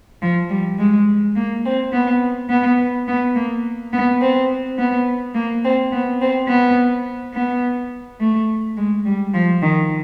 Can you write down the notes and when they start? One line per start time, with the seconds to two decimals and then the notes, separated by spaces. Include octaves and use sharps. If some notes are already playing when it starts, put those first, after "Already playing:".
0.22 F3
0.50 G3
0.79 G#3
1.36 A#3
1.64 C4
1.93 B3
2.49 B3
3.07 B3
3.35 A#3
3.93 B3
4.21 C4
4.78 B3
5.35 A#3
5.63 C4
5.92 B3
6.21 C4
6.49 B3
7.34 B3
8.20 A3
8.77 G#3
9.05 G3
9.34 F3
9.62 D#3